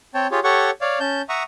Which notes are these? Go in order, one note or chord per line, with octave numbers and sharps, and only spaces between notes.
C4 C#5 G5 A5
F4 G4 G#4 C#5
G4 A4 C#5 F#5 C#6
C#5 D5 F5
C#4 A5 G6
E5 F#5 A#5 C#6 D#6